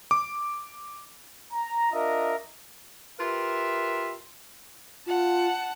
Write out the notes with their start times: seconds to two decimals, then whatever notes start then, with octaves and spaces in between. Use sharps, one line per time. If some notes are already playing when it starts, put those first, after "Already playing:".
0.11 D6
1.53 A#5
1.92 D4 F4 A#4 D#5 E5
3.19 F4 G4 A#4 B4 E5
5.06 F4 F#5 A5